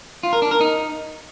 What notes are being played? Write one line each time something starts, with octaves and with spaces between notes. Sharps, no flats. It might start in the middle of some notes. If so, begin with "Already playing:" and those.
F4
A#4
D4
A#4
D#4